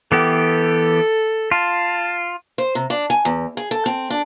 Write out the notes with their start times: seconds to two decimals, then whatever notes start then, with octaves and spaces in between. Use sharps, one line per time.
0.12 E3 B3 G4 A4
1.52 F4 A5
2.58 C5
2.75 C3
2.90 D4
3.10 G#5
3.25 E2
3.57 G#4
3.71 A4
3.86 C4
4.10 D4